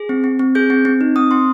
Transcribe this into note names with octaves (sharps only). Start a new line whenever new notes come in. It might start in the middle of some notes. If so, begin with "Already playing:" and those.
Already playing: G#4
C4
C4
C4
G#4 G6
C4
C4
D#4
C4 D#6
C4 C6